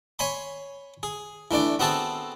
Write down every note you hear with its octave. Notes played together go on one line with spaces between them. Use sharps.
C#5 G#5 B5 C6
G#4
E3 A3 D4 D5
B3 C4 F#4 G#4 A4 A5